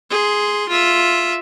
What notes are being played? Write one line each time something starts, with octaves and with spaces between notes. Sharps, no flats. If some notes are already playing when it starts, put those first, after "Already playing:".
G#4 C6
F4 E5